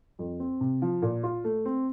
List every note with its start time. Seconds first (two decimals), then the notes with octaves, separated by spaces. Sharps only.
0.19 F2
0.40 C4
0.61 C3
0.82 F3
1.02 A#2
1.23 F4
1.44 A3
1.65 C4